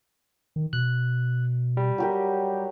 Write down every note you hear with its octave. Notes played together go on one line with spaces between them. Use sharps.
D#3
B2 F#6
G3
F#3 G4 A#4